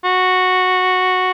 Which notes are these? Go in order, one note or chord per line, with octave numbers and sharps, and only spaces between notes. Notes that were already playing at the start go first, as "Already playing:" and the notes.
F#4